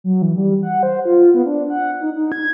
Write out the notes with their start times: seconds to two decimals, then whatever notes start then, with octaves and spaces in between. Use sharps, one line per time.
0.04 F#3
0.22 E3
0.36 G3
0.63 F#5
0.83 C5
1.05 F4
1.34 B3
1.46 D4
1.70 F#5
2.01 D#4
2.15 D#4
2.32 G#6